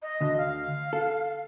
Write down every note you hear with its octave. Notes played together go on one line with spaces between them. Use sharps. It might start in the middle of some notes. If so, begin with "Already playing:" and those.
D#5
D2 D3
F5
A4